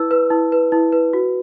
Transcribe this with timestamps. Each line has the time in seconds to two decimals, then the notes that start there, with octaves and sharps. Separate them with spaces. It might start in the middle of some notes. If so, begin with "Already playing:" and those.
Already playing: E4 B4 E6
0.11 B4
0.30 E4
0.52 B4
0.72 E4
0.92 B4
1.13 F#4